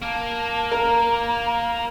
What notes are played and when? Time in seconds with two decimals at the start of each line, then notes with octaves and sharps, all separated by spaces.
0.02 A#3 A5
0.72 A#4 A#5